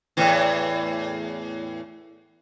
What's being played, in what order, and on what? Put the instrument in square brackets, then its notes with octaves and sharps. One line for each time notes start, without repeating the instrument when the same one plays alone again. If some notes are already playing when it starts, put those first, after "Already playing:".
[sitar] E2 A2 E3